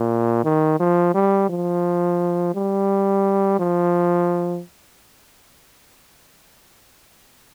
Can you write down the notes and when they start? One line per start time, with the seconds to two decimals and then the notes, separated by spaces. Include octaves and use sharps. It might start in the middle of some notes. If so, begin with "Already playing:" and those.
Already playing: A#2
0.44 D#3
0.80 F3
1.14 G3
1.49 F3
2.54 G3
3.59 F3